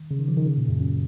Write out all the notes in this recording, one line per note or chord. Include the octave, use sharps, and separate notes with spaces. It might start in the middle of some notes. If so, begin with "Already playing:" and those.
Already playing: D#3
C#3
D#3
F3
D#3
C#3
A#2
F#2
F#2